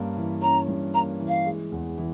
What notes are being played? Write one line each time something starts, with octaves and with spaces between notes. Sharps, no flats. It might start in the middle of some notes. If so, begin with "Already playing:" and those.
Already playing: G2 A#3 C#4
E3
C#4 A#5
G2
A#3 A#5
E3
F5
G#3
E2
E3